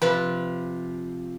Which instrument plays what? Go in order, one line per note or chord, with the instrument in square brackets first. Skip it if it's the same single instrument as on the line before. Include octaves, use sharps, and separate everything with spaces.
[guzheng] C3 F3 [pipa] B4